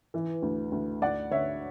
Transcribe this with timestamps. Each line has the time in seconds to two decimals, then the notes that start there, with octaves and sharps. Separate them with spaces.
0.14 E3
0.42 D2
0.72 D2
1.02 D2 D5 F#5
1.31 D3 C#5 E5